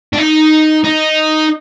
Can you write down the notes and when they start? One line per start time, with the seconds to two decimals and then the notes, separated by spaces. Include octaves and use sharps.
0.13 D4
0.18 D#4
0.84 D#4